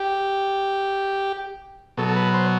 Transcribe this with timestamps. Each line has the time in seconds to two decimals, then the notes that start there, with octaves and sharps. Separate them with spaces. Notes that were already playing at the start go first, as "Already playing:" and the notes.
Already playing: G4
1.97 B2 F#3 A4
2.08 A4
2.16 B4
2.34 C5